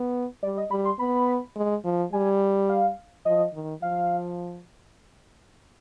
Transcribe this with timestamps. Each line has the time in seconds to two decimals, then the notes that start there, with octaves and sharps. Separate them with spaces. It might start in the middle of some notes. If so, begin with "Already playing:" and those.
Already playing: B3
0.43 G3 D5
0.58 D#5
0.71 G3 B5
0.85 C6
0.99 B3 B5
1.56 G#3
1.84 F3
2.13 G3 G#5
2.69 F5
3.25 F3 D#5
3.54 D#3
3.82 F3 F5